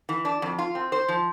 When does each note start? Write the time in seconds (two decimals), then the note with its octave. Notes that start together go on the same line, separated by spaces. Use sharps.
0.09 E3
0.25 D4
0.42 F2
0.58 F4
0.75 C4
0.92 C5
1.08 F3